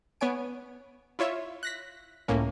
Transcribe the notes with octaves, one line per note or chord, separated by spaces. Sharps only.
B3 C#5 G#5 D7
E4 F4 C#5 E5
F#6 A#6 B6
C#2 A2 A#3 C#4